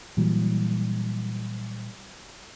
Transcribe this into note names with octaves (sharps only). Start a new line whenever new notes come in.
A#2 E3 F#3 G3